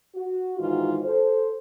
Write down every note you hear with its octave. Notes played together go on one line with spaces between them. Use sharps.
F#4
G#2 D#3 E3 F4 F#4
A4 C5